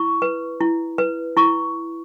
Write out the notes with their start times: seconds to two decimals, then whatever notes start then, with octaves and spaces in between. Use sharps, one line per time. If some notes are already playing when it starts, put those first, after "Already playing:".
Already playing: E4 C#6
0.22 B4
0.61 E4
0.98 B4
1.37 E4 C#6